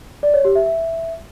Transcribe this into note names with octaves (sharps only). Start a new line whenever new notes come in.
D5
C#5
G4
E5
E5